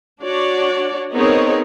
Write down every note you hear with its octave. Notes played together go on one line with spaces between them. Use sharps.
D4 F#4 C#5 D5
B3 C4 D#4 G#4 A#4 C#5